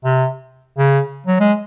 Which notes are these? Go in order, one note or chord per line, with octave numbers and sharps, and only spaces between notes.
C3
C#3
F#3
G#3